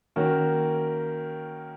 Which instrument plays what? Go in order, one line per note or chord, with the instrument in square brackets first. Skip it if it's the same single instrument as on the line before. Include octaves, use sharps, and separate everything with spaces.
[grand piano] D#3 A#3 C#4 F#4 A#4